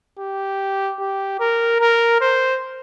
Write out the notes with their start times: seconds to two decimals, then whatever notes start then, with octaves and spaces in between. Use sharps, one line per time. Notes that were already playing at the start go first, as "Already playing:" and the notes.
0.19 G4
1.00 G4
1.40 A#4
1.80 A#4
2.21 C5